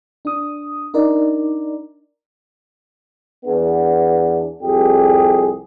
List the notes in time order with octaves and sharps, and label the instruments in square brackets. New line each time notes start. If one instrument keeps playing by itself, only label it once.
[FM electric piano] D4 D#6
D4 D#4 A#4 D5
[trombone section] E2 B3 D4
C2 F2 G4 G#4